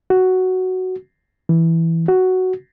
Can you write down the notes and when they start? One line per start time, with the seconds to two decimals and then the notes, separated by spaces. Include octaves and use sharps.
0.10 F#4
1.49 E3
2.08 F#4